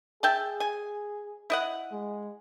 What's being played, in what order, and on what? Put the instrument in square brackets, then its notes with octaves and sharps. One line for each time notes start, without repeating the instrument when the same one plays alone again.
[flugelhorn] G#4 [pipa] E5 G5 A5
[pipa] G#5
E4 D#5 F#5
[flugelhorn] G#3